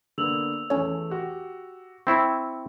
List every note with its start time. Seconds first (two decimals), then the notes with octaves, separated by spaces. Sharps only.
0.18 D3 A#3 B3 E6 F7 F#7
0.70 E2 A3 C#4 C#5
1.10 F#4 G4
2.07 C4 E4 G5 C#6